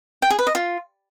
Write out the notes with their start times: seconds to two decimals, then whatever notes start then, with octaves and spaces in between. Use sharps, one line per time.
0.22 G5
0.30 G#4
0.39 B4
0.47 D#5
0.55 F4